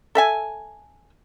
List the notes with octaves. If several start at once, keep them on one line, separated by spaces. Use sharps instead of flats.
A4 E5 G#5